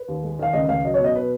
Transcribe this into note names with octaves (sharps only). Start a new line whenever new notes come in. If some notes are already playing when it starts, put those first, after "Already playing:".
Already playing: B4
D#2
G#3
D#3 F5
C#2 D#5
C#2 F5
F#3 D#5
C#5
B2 D#5
B4